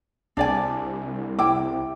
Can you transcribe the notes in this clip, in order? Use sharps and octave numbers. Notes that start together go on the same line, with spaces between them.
C2 D4 D5 G#5
E4 G5 D6